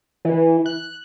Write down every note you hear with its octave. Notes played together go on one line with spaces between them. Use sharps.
E3
F#6